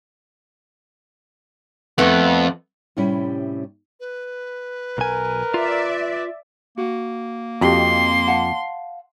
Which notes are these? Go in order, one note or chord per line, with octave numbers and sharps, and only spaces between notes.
F2 A3 B3
A2 C3 G3 C#4 E4 G4
B4
B1 A#4 G#5
F4 D5 E5
A#3 F#4
F2 F#4 G4 D#5 C6
F5 F#5 A5